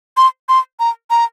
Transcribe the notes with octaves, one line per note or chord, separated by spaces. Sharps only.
C6
C6
A#5
A#5